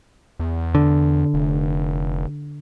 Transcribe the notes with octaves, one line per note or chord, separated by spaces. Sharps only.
E2
D3
F1